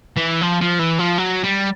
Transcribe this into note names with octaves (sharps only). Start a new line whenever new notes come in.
E3
F3
F3
E3
F3
F#3
G3